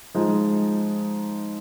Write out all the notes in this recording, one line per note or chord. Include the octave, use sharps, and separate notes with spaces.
F3 G#3 D#4